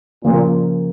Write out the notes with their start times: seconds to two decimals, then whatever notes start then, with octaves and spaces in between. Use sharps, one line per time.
0.24 A#2 C#3 F3 A#3